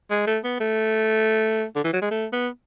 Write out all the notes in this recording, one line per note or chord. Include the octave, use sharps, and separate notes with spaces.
G#3
A3
B3
A3
D3
E3
F#3
G#3
A3
B3